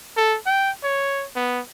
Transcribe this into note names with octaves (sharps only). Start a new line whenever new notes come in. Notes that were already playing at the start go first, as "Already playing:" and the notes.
A4
G5
C#5
B3